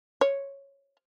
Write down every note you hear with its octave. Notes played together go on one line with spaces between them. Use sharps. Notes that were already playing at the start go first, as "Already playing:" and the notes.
C#5